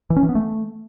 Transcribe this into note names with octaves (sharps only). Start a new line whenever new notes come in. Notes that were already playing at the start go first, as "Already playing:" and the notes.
E3
C#4
E3
B3
A3